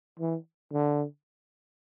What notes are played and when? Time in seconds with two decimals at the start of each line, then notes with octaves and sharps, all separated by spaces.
0.20 E3
0.73 D3